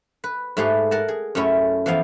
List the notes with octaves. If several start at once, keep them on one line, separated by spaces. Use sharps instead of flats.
B4
G#2 A3 G4 G#4 B4 F5
A#4 F#5 A5
G#4
F#2 A3 C#4 E4
E3 F3 B3 F5